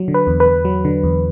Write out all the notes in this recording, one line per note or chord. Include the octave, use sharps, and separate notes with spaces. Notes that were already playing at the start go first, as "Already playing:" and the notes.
Already playing: F#3
D3
B4
E2
B4
E2
F#3
D3
E2